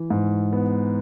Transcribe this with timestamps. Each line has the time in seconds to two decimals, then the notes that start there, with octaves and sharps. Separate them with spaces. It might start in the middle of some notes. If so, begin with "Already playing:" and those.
Already playing: E3
0.10 G#2
0.53 B3